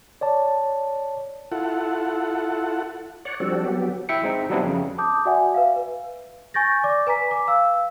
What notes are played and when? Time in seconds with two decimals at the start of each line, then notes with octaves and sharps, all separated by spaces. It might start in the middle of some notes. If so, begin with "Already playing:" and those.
0.21 C#5 D5 A5
1.52 E4 F4 A4 F#5
3.25 C#5 D5 F#5
3.40 F3 G3 C4 D4 F#4 A4
3.65 F#3 B3 G4
4.09 E4 E5 G5 C#7
4.23 G#3 C4 D#4
4.49 F#3 G3 B3 C4 D4 E4
4.63 F2 C#3
4.98 A5 D6 D#6 G6
5.25 F#4 D5 E5 F#5 G#5
5.54 B4 E5 F5
5.76 B4
6.54 G#5 C#6 G6 A6 A#6
6.84 D5 D6
7.07 B4 G#5 A#5 B6
7.31 D6
7.48 F5 E6